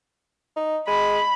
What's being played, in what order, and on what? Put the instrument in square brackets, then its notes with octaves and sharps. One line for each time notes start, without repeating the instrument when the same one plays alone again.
[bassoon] D#4
[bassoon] G#3 [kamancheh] B5